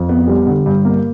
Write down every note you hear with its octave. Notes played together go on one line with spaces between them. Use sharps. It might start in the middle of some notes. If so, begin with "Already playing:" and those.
Already playing: F2
B3
G3
D3
G2
A#3